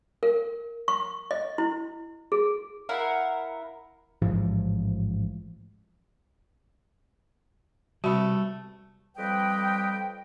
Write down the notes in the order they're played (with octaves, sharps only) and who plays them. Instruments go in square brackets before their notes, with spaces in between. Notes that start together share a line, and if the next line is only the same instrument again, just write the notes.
[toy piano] A#4
C#6
D#5
E4
G#4
[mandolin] E4 A#4 F5 F#5
[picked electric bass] A1 G#2 F3
[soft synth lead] C3 [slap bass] G3 [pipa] A3 B3 [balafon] F#4
[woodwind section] F2 G3 B4 D#5 G5